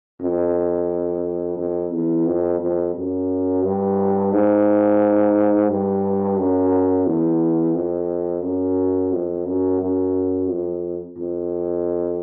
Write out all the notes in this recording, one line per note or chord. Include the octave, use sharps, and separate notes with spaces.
F2
F2
E2
F2
F2
F#2
G2
G#2
G2
F#2
E2
F2
F#2
F2
F#2
F#2
F2
F2